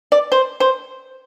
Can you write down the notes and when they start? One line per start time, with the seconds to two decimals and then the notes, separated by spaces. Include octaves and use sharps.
0.12 D5
0.32 C5
0.60 C5